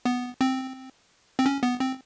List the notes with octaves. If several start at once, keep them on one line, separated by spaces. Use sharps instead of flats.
B3
C4
C4
C#4
B3
C4